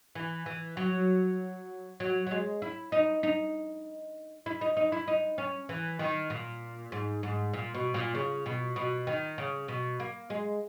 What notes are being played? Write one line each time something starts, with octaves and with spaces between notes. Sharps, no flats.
E3
E3
F#3
F#3
F#3
G#3
E4
D#4
D#4
E4
D#4
D#4
E4
D#4
C#4
E3
D#3
A#2
G#2
G#2
A#2
B2
A#2
C#3
B2
B2
D#3
C#3
B2
A#3
G#3